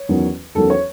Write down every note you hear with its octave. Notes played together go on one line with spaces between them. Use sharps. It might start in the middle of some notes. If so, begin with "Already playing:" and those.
Already playing: C#5
E2 D#3 F#3 C#4
E2 D#3 F#3 C#4 A4
C#5